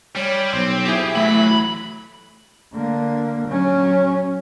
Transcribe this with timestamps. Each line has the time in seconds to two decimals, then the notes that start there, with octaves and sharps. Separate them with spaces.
0.16 G3 C#5
0.54 B1 C4
0.85 E4 G4 G#4
1.16 E3 F#3 A3 B5
2.73 D3 A#3
3.48 F#3 C#4